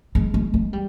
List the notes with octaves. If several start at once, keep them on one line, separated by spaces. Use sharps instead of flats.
G#3
G#3
G#3
G3